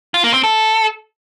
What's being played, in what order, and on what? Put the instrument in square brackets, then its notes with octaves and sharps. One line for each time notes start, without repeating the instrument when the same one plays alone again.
[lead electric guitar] F4
A#3
C4
A4